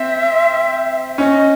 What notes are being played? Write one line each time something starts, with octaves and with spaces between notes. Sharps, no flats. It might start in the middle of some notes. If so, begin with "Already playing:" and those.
Already playing: C4 E5
C#4 D#5